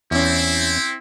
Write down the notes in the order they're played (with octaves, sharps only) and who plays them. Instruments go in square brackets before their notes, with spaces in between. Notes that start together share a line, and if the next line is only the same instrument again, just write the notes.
[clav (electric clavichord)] E2 C#4 [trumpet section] C4 E4